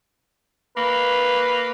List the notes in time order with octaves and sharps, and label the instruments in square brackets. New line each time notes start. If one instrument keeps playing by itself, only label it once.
[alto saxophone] A#3 [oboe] B4